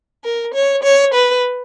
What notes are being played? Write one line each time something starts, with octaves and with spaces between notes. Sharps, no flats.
A#4
C#5
C#5
B4